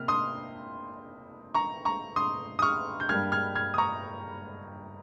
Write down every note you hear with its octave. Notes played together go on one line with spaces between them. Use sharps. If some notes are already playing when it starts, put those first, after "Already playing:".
Already playing: C3 A#3 F6
C6 D#6
A#5 C#6
A#5 C#6
C6 D#6
D#6
C#6 F6
G6
G2 G3 A#3 F6 G#6
F6 G#6
F6 G#6
D#6
A#5 C#6